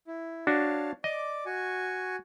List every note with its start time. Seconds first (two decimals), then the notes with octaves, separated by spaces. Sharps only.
0.07 E4
0.47 D4 F#4 C#5 F5 A5
1.04 D5 D#5 D6
1.46 F#4 G#5 C#6